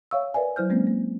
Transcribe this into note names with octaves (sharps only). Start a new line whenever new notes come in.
C#5 E5 F5 C#6 E6
A#4 B4 D5 E5 G#5
F#3 E4 C5 F6 G6
G#3 A#3 C4 C#4
A#3